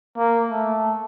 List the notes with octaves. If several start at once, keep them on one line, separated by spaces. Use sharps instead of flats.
A#3
A3